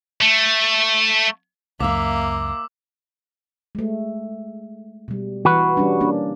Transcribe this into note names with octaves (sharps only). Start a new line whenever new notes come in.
A3
C#2 F#2 A#3 E5 F5 D6 E6
G#3 A3
B2 G3
E3 F#4 B4
G3 C#4 D4
A#3 C#4 D4